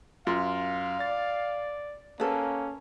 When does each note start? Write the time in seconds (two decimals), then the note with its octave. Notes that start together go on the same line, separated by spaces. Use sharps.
0.27 F#2 F4 F5
1.00 D5 A6
2.20 A#3 C#4 A4 B4